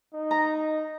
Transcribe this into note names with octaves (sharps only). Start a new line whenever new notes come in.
D#4
A#5